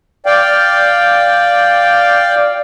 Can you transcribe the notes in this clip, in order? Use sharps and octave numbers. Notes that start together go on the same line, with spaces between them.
D5 F5 G5